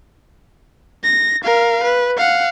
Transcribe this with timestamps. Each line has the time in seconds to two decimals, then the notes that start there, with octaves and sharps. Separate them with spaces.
1.04 A#6
1.44 A#4 F5
1.84 B4
2.17 F5 F#5